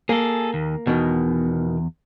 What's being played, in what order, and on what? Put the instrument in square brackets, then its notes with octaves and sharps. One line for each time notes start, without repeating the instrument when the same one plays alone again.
[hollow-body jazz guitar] A#3 [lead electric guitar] G#4 A4
[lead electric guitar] D#2
[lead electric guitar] E2 [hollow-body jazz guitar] B2 D#3